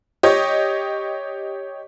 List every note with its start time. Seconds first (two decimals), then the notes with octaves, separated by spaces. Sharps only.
0.23 G4 C#5 D#5